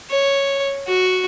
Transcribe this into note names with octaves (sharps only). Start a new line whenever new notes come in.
C#5
F#4